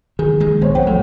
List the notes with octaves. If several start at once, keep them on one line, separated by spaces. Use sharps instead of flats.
D#3 G#4
D#3 G#3
A#1 B3 C5 C#5
F2 F#5 G5
A2 F#3 G#3 A3